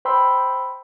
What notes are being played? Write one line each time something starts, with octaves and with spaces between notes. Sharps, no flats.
C5 G5 B5 C6 E6